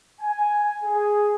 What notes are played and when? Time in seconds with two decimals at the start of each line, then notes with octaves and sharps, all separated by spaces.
0.21 G#5
0.84 G#4